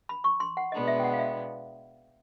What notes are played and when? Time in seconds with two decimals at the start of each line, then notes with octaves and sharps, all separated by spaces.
0.09 B5
0.24 C#6
0.40 C6
0.57 F#5
0.72 B2 G#3 B3 D4 D#5
0.88 E5
1.00 G5
1.04 F#5
1.13 F5
1.19 E5